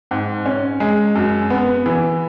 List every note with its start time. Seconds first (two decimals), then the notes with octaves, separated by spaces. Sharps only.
0.11 G#2
0.46 C#4
0.80 G#3
1.15 F#2
1.50 B3
1.86 E3